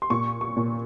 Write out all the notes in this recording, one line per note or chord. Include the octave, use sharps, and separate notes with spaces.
C6
A#2 C#6
C#6
A#2